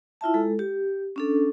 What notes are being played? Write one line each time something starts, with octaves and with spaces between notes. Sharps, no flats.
E4 F4 E5 A5
G#3 A4
G4
C#4 D4 A4